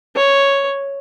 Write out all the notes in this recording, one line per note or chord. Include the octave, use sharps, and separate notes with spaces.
C#5